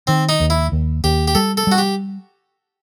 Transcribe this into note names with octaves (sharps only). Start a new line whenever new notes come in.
D#3 C4
D#4
D#2
E4
D#2
D#2 G4
G4
G3 A4
A4
G3 F#4
G4